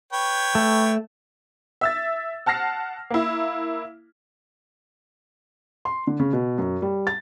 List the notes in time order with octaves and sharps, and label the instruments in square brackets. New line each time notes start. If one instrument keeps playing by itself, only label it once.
[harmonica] B4 C#5 G5
[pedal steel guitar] A3
[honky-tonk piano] E5 E6 A6
F#5 A5 F6 A#6 C7
A#3 E4
[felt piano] C6
D3
C#3
B2
F#2
G3
A6